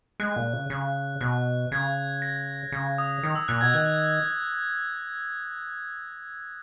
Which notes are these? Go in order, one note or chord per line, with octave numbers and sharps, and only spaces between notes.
G#3 F#6
A#2
C#3
C#3
B2 F#6
C#3 G#6
A#6
C#3
D#6
D#3 D#6
E6
A#2 F#6
B2 G#6
D#3 F#6